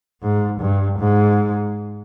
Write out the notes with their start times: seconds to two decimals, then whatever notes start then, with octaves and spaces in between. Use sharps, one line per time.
0.22 G#2
0.61 G2
0.99 G#2